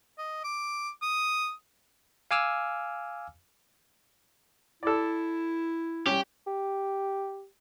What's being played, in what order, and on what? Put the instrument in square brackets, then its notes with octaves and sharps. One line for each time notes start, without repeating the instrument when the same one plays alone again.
[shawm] D#5
D6
D#6
[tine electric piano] F5 G#5 D6 E6 F6
[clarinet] E4 [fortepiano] A4 D5
[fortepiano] G3 C#4 [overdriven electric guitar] G4
[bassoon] G4